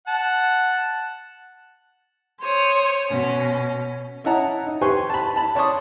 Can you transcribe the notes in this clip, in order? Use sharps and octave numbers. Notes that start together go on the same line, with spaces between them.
F#5 A5
C5 C#5 D#6
B2 C#4
C#4 E4 D#5 F#5 A5 A#5
D#4
G4 B4 C5 G#5 C6 C#6
A5 B5
A5 B5
C#5 D5 A5 C6 C#6 D#6